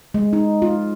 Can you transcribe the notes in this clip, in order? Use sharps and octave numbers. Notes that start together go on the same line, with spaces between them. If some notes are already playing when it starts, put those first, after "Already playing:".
G#3
D#4
F4